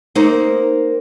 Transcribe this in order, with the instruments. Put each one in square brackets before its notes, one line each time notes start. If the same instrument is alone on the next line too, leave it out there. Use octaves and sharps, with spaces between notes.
[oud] A#3 C4 D#4